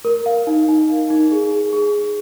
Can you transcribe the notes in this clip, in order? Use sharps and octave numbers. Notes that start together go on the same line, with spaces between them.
A#4
F5
D#4
D#4
D#4
D#4
G#4
G#4
G#4
G#4